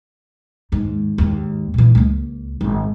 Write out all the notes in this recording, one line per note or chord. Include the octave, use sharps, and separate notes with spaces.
D#2 G#2
D#2 G#2
A#2 E3
C#2 A#3
G#1